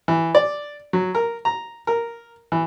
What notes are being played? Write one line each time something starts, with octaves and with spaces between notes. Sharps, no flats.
E3
D5
F#3
A#4
A#5
A#4
E3